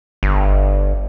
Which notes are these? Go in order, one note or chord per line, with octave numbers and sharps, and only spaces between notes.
G1